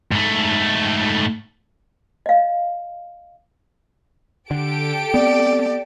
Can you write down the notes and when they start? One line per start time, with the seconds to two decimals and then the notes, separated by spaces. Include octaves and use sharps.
0.12 G#2 A3
2.26 D#5 F5
4.51 D3 G4 A4 D7
5.14 B3 C4 D5